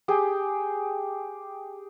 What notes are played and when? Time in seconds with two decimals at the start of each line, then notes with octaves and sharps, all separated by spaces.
0.08 G4 G#4 G5